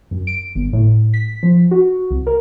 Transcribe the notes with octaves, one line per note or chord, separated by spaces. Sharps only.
F#2
D7
G1
A2
B6
F3
F#4
C2
A#4